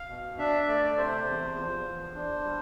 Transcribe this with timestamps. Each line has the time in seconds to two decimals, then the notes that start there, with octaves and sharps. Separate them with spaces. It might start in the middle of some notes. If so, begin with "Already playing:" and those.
Already playing: F5
0.09 B2
0.38 D4 E5
0.63 E5
0.68 A3 D5
0.86 D5
0.98 C3 C5
1.27 E2
1.56 F3
1.85 E2
2.15 D4
2.44 G3